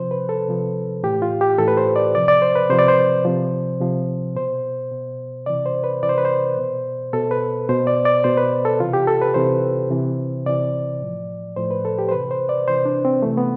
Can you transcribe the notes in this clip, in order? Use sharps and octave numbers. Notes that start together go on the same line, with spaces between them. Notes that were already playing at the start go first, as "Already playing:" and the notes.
Already playing: C3 F3 C5
B4
A4
C3 F3
A2 E3 G4
F4
G4
A2 E3 A4
B4
C5
D5
C3 F3 D5
D5
C5
B4
C3 F3 C5
D5
C5
C3 F3
C3 F3
B2 C5
B2
C3 E3 D5
C5
B4
C3 E3 D5
C5
B4
C5
B2
B2 A4
B4
B2 C5
D5
D5
B2 C5
B4
A4
C3 E3 F4
G4
A4
B4
C3 E3 C5
C3 E3
C3 E3 D5
A2 F3
A2 F3 C5
B4
A4
G4
C5
C3 E3 B4
C5
D5
C3 E3 C5
D4
C4
C3 E3 A3
B3